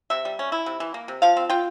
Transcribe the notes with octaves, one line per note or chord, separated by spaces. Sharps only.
C3 E5
G3
C#4
E4
C3
E3
A#3
C3
F3 F5
C4
F4 G5